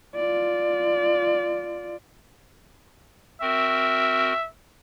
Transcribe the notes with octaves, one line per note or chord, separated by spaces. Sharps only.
F4 D5
C4 F#4 A#4 E5